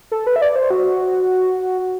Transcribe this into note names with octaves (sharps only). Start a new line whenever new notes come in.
A4
B4
E5
D5
C5
F#4